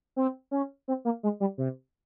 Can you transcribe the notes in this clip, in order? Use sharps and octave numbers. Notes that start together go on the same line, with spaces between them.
C4
C#4
C4
A#3
G#3
G3
C3